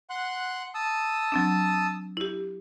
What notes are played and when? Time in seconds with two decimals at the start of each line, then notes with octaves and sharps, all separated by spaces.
0.10 F#5 C6 F#6
0.75 A5 D#6 E6
1.32 F#3 C4 D4
2.17 E4 G4